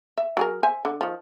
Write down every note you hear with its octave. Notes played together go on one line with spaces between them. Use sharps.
E5
F#3 G#4 A#4
C5 E5 G#5
D3
D#3 F3